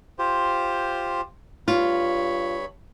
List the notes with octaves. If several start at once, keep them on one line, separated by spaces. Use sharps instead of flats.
F4 G4 C5
G2 F4 C#5 B5